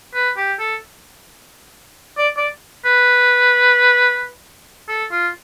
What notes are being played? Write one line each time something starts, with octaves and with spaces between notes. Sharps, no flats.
B4
G4
A4
D5
D5
B4
A4
F4